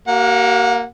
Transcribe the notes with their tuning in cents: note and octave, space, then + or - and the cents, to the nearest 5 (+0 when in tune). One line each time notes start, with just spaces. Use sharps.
A#3 +0 G4 -45 F#5 -35